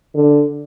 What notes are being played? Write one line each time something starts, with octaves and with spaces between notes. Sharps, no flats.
D3